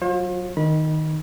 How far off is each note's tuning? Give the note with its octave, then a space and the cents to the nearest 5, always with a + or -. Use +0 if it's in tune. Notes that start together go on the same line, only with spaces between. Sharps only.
F#3 +0 F4 +35 C5 +45
D#3 +0 B5 -30